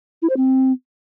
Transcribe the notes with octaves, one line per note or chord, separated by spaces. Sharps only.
E4
C5
C4